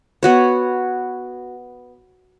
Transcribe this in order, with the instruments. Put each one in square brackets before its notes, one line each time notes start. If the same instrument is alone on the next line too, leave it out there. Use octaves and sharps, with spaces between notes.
[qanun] B3 F#4 C#5